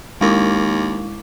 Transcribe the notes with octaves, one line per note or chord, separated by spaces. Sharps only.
D#2 G#3 E4 D6